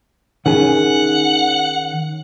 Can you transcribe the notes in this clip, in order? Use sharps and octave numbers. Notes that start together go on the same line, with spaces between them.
D#3 C#4 G#4 F#5